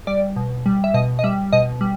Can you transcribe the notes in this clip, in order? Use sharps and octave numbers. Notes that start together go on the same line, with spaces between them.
G3 D5
B2
G3
E5
B2 D#5
D#5
G3 E5
B2 D#5
G3